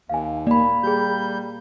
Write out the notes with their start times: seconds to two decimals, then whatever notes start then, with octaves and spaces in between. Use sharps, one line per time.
0.09 D#2 F5 G#5
0.47 A#3 D5 B5
0.83 G3 G4 G#4 G6